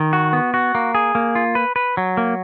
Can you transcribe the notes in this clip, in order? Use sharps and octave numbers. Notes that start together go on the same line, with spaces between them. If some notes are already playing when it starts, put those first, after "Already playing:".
Already playing: D#3
F#4
B3
F#4
A#3
G#4
A#3
F4
B4
B4
F#3
A#3